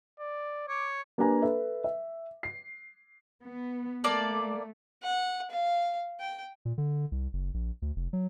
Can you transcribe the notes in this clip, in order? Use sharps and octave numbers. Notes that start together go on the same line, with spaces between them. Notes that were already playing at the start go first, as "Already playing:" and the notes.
D5
C#5 D6
A#3 D4 G4 B4 G#5 A#5
A4 B4 E5
E5
C7
B3
A3 A#3 D5 A5
F#5
F5
G5
A#2
D3
C2
F#1
A#1
D2
F1
F#3